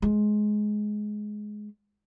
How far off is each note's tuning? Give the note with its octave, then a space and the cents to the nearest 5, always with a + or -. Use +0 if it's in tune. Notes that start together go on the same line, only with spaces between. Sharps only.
G#3 +15